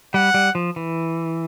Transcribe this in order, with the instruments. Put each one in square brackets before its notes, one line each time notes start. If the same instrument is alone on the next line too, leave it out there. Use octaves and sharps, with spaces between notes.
[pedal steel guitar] G3 [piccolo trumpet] F#5
[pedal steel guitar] G3
F3
E3